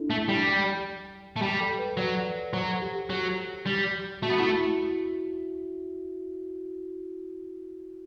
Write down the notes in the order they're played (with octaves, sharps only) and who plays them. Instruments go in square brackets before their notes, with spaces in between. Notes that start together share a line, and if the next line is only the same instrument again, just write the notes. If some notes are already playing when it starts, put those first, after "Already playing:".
Already playing: [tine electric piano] D4 E4 A4
[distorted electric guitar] A3
G3
A3
[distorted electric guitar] G3 [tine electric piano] G4
[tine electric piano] A4
B4
[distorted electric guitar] F#3 [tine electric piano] D5
[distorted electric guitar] F#3 [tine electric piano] C5
[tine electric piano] A4
G4
G4
[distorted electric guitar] F#3
G3
[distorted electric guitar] A3 [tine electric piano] F#4
[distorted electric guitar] B3
[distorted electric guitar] A3 [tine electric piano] E4